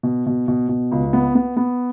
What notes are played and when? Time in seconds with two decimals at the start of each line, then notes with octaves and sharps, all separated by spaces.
0.03 B2
0.26 B2
0.48 B2
0.69 B2
0.92 C#2
1.13 B3
1.35 B3
1.57 B3